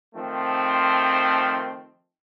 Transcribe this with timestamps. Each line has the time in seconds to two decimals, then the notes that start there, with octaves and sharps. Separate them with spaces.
0.14 D#3 F3 A3 C4